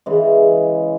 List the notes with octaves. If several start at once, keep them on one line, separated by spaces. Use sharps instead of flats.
C#3 E3 G#3